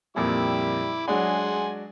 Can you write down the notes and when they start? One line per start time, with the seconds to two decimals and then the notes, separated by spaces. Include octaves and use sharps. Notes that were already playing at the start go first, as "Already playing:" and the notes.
0.16 F2 A#2 G3 E4 D6
1.08 F#3 G#3 D4 G#4 F#5 G#5 C6